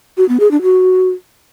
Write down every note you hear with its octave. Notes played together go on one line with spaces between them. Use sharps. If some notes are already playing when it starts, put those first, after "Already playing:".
F#4
B3
G#4
D4
F#4